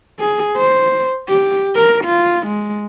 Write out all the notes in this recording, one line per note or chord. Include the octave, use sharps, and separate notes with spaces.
G#4
C5
G4
A#4
F4
G#3